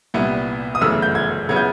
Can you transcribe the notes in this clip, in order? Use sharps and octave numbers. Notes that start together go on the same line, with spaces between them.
C2 A#2 G3 B3 E4
D#6
G1 F#2 C#3 E3 A3 E6
G6
G#6
C#3 F#3 B3 E4 G#6
G6